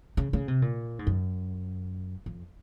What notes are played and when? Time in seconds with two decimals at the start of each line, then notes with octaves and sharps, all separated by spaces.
0.17 C#3
0.33 C#3
0.48 C3
0.62 A#2
0.99 G#2
1.07 F#2
2.26 F2